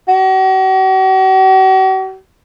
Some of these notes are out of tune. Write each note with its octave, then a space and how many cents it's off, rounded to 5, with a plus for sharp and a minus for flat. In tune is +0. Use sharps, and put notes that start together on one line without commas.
F#4 +45